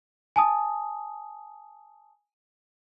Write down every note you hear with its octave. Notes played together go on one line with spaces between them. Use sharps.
G#5 A5 D#6